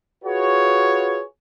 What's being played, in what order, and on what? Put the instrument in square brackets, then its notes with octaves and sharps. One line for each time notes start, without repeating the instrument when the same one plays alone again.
[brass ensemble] F4 F#4 G#4 B4 C#5